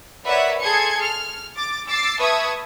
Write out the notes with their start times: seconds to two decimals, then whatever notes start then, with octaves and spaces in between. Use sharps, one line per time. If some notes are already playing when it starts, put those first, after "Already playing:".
0.24 A#4 B4 C#5 D5 E5 F#5
0.60 G#4 A4 C6 G#6 C#7
1.01 F6
1.57 D6 A6
1.87 D6 E6 A6 C7
2.19 B4 E5 A5 C#6 D#6 G#6